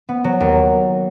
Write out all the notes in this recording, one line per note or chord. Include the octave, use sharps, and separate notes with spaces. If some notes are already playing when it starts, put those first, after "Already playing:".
B3
F#3
D#2